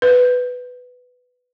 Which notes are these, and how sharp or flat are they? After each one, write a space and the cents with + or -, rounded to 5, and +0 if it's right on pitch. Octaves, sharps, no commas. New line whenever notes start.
B4 +10